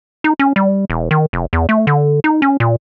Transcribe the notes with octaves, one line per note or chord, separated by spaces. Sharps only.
D#4
C#4
G3
E1
D#3
F1
E2
A3
D3
D#4
C#4
A#2